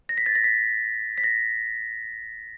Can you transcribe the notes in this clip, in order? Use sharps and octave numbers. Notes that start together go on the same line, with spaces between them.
A#6
B6
A6
A#6
B6
B6
A#6